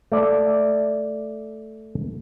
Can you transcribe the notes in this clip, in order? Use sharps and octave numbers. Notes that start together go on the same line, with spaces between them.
A3 D5